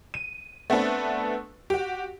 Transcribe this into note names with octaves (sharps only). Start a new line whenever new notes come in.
D#7
A3 B3 C4 D4 A4 B4
F#4 G4